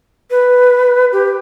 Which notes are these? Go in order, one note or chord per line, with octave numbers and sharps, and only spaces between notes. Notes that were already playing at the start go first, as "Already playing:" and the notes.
B4
G4